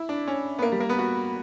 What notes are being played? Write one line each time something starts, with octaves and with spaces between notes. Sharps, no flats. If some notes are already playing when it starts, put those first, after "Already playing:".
Already playing: E4
D4
C#4
B3
A#3
G3
A#3
B3
F#4